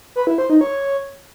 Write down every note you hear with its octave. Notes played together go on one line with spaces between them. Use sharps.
B4
E4
C5
D#4
C#5